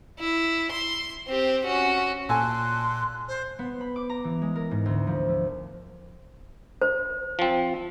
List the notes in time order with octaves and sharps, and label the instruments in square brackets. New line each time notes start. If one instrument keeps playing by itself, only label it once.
[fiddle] E4
C6
C4 G4
C#4 F#4
[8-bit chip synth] A#2 [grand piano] A4 G#5 [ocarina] C6 [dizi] F#6
[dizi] C5
[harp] B3
B5
D6
A#5
E3
G#3
A#4
G#2
D2
F3
A3
[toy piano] C5
[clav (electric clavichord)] F3 C4